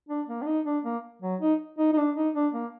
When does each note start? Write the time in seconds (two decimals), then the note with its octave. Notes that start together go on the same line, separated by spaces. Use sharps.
0.09 D4
0.28 A#3
0.42 D4
0.46 D#4
0.66 D4
0.84 A#3
1.22 F#3
1.41 D#4
1.78 D#4
1.93 D#4
1.98 D4
2.16 D#4
2.35 D4
2.53 A#3